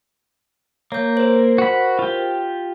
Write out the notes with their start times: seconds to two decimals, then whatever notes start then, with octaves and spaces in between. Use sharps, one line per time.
0.92 A#3 C#5 G6
1.17 A#4 C5
1.58 F#4 B5
1.99 F4 G4